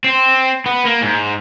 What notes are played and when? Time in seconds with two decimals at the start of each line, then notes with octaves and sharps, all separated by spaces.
0.04 C4
0.66 B3
0.85 A#3
1.01 G#2